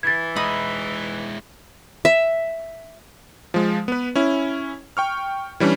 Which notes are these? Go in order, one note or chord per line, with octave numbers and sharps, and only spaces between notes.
E3 G#6 A6
G#3 D#4 E4 B5 D#6
E5
F3 G#3
B3 B4
C#4 E4
G5 C#6 F6
E3 G3 C#4 D4